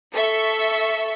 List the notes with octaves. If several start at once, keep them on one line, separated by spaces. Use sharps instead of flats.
A4 E5 C#6